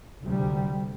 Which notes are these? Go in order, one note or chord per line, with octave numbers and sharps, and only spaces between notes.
D2 C3 G3